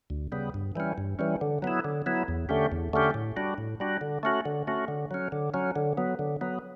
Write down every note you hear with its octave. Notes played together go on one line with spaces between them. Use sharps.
D2
C#3 G3 B3
G2
E3 G3 C#4
G2
E3 G3 C#4
D3
F#3 B3 E4
D3
F#3 B3 E4
E2
D3 A3 C#4 G4
E2
D3 A3 C#4 G4
A2
G3 D4 F#4
A2
G3 D4 F#4
D3
A3 C#4 F#4
D3
A3 C#4 F#4
D3
F#3 C#4
D3
F#3 C#4
D3
F#3 B3
D3
F#3 B3